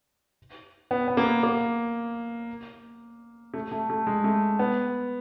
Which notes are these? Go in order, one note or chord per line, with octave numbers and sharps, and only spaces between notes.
B3
B3
A#3
A#3
A3
A3
A3
G#3
A3
B3